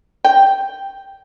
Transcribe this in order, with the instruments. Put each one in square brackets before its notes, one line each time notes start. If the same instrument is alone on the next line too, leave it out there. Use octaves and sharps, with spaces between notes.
[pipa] G5